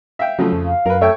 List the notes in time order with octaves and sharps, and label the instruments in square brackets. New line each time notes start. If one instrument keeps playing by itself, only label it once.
[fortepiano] E5 F5 G5
[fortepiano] C#3 F3 A3 [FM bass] F#3
[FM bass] F2
[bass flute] F5
[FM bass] F#2 [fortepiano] A#4 B4
[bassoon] A3 [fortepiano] C#5 G5 C#6